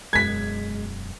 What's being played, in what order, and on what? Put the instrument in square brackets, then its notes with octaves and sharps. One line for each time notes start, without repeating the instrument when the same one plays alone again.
[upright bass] E1 F#2 [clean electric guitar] G#3 [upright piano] G#6 B6